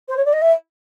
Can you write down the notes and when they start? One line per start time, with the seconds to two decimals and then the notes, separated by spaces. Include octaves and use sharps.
0.08 C5
0.17 C#5
0.25 D5
0.33 D#5
0.42 E5